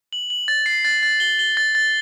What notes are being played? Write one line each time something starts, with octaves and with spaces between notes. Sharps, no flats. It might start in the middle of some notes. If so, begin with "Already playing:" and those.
F#7
F#7
A6
C7
A6
A6
G7
G7
A6
A6